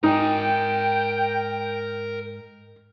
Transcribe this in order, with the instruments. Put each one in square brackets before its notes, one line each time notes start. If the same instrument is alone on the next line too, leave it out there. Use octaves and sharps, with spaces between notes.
[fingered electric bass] G#2 [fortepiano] D#4 [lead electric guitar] A#4 G#5 [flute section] G5